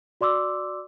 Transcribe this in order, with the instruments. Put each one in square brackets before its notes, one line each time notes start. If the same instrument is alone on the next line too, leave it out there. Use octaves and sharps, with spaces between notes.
[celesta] F#4 D5 C6 D6 E6